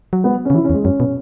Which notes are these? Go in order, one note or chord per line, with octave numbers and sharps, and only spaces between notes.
F#3
G#3 B3
C#4
C#3
E3 E4
C#4
E2
G#3
F#2 C#4
B2